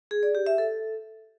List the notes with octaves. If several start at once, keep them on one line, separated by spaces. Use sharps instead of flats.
G#4
D5
G4
E5
A4